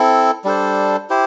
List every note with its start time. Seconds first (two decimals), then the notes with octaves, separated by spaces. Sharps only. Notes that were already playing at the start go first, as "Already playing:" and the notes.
Already playing: C4 E4 A4
0.44 G3 D4 A4 C5
1.10 E4 G4 C5